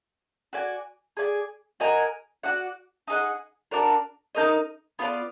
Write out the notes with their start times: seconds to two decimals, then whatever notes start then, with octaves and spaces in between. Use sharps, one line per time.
0.53 F#4 D5 G#5
1.17 G#4 D5 G#5
1.80 F#4 A#4 D#5 G#5
2.43 F#4 D5 F#5
3.07 D#4 G#4 D#5 F#5
3.71 D4 F#4 A#4 D5
4.35 D#4 F#4 A#4 D#5
4.99 B3 F4 B4 D5